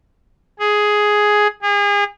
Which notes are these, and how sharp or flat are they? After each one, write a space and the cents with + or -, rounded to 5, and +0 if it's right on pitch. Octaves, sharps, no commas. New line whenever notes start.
G#4 +5
G#4 -35